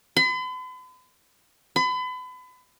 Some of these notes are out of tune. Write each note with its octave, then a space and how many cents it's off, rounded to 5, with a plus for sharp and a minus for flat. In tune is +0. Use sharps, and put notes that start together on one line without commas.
B5 +45
B5 +35